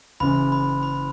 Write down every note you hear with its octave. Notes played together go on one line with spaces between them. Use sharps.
F#1 F#2 C#3 E3 B5
B5
B5